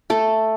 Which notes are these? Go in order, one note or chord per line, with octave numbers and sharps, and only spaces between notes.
A3 A4